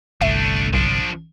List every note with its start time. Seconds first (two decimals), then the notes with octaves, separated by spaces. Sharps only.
0.21 G1 C2 A3 D4 E5
0.74 B1 F3 D4